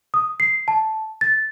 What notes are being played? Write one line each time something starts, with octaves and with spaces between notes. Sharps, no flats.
D#6
C7
A5
A6